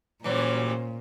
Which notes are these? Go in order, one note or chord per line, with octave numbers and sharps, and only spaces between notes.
A#2 E3 F#3 G3 C#4 C5